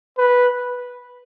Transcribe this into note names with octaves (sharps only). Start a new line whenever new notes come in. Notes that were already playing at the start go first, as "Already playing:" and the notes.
B4